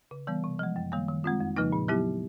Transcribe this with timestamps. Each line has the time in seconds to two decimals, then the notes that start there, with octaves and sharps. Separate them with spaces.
0.11 C#3
0.27 E3 G3 B3
0.44 C3
0.59 F3 G#3
0.76 F#2
0.92 D#3 G3 A#3
1.08 D#3
1.24 G#3 C4 F4
1.40 F2
1.57 C#3 F3 A#3 D#4
1.72 A#2
1.88 F#3 B3 E4 G4